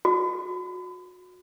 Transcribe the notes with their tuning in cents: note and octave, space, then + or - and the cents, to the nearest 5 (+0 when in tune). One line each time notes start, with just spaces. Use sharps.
F#4 -30